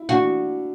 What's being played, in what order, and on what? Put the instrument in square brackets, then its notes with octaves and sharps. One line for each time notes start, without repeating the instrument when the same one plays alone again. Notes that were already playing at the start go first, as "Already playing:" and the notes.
Already playing: [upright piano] E4
[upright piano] D4 [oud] F#4